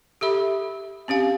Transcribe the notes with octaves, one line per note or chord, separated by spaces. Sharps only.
G4 A4 E5 B5
C4 C#4 G4 F5